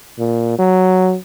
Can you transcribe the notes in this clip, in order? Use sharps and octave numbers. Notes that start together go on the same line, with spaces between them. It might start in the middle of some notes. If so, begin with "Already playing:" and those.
A#2
F#3